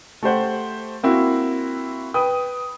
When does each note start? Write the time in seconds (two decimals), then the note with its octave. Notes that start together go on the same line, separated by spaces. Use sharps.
0.22 A3 G4 C5 F#5
1.03 A#3 C4 E4 F#4
2.14 B4 G5 D#6